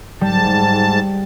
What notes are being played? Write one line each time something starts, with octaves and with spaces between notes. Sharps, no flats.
G#2 G3 A5